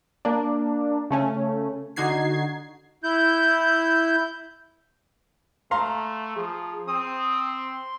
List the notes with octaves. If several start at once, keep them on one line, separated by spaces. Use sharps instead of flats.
A#3 D4
C#3 A3 C#4
D3 D#4 F#4 G#6 C7
E4 G6
A3 F5 A#5 C6
F3 G#4
C4 D#6
C6